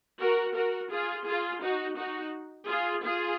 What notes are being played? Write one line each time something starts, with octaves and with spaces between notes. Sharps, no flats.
F#4 A#4
F#4 A#4
F4 G#4
F4 G#4
D#4 F#4
D#4 F#4
F4 G#4
F4 G#4